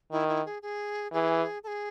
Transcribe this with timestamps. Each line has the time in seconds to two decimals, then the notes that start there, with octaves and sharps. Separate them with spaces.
0.12 D#3 E4
0.28 E4
0.45 G#4
0.62 G#4
1.12 E3 G#4
1.63 A4
1.67 G#4